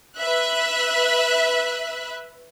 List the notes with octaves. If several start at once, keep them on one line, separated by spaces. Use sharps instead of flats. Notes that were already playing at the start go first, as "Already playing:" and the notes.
B4 E5 F#6